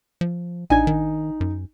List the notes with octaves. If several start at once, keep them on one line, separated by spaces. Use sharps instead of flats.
F3
A1 D4 D#4 G#5 G#6
D#3
F#2